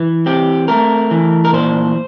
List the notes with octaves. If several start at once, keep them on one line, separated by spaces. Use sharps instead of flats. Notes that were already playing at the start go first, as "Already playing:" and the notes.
Already playing: E3
C4 G4
A3 A#4
E3
A#4
A#2 C5